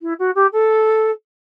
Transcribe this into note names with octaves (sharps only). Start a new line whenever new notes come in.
E4
F#4
G4
A4